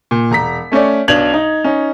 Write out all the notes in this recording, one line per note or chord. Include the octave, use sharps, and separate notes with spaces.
A#2
E1 A#5 B6
A3 C#4 C#5 D5
B1 B2 D4 G#6 F7 F#7
D#4
C#4 D#4